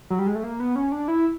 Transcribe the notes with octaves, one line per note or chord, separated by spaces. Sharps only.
F#3
G3
G#3
A3
A#3
B3
C#4
D4
E4